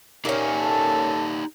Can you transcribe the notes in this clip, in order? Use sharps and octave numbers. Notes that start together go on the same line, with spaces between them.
A#3 C#4 D#4 G4 D5
A4